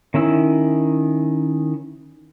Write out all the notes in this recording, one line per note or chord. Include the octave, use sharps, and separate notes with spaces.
D#3 C#4 E4 E6